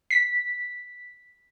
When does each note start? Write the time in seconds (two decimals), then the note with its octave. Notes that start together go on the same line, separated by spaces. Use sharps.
0.11 B6